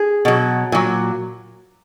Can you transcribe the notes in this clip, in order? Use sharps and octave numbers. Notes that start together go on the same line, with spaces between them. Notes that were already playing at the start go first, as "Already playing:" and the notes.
Already playing: G#4
B2 F#3
A#2 F#3